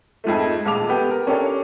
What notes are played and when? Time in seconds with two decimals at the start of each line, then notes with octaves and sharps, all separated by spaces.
0.24 F2 G#2 F3 A3
0.65 D#1 G#3 F5 A5 D6 F7
0.89 B3 G4 A4
1.11 A#4
1.27 C#4 D4 G4 A4 A#4 C#5